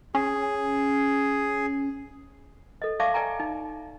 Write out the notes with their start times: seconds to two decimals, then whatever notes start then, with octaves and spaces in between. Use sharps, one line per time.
0.15 C#4 G#4
2.82 A4 D#5
3.00 D5 E5 F5 A5 C#6 D6
3.14 D5 G5 G#5 A#5
3.40 D#4